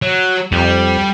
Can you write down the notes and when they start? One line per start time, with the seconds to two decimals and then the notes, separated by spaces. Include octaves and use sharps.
0.02 F#3
0.52 F2 G3